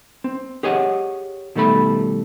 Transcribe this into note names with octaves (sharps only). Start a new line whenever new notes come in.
C4
G4 G#4 C#5 D#5 F#5
B2 D#3 G3 A3 A4 B5